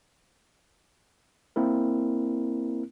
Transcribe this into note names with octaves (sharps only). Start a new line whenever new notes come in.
A#3 C4 E4 A#4